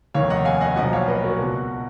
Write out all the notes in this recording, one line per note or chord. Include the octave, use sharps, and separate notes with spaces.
F1 D#2 D#3 C#5 F5
D#5 F#5
F5 G#5
D#5 F#5
B1 A#2 F3 D#5 F#5
C#5 F5
B4 D#5
F#4 A#4
C#2 B2